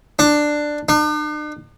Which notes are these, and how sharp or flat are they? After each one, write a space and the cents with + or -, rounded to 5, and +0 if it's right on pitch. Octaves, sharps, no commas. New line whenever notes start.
D4 +10
D4 +45